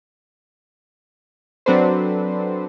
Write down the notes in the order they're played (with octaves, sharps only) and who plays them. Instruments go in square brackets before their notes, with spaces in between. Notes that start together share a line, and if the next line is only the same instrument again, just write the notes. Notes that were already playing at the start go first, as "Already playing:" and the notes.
[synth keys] F#3 C4 D4 A4 B4 C5